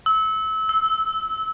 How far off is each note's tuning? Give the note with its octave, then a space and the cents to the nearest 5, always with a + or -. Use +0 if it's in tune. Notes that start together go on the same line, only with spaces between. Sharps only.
E6 -25
E6 -10